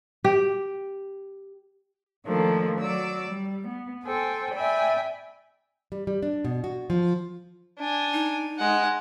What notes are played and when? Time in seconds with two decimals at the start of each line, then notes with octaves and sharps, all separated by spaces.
0.24 G4
2.26 D#3 F3 A3 A#3 D4
2.79 F#3 D5 E6
3.30 G3
3.68 B3
4.05 A4 C5 G5 G#5
4.55 D5 E5 G5 G#5 B5
5.92 G3
6.07 G3
6.22 D4
6.45 B2
6.64 F#4
6.90 F3
7.79 D4 G#5
8.13 D#4
8.58 G#3 F#5